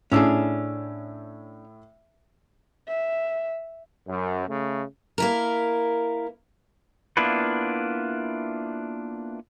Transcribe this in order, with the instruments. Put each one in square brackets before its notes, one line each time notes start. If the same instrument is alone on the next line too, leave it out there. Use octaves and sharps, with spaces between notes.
[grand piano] A2 E6 [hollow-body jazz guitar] C#4 D4 G#4
[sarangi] E5
[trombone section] F#2
C#3 A3
[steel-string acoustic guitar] A#3 E4 A#4
[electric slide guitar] A#3 B3 D4 E4 F4 B4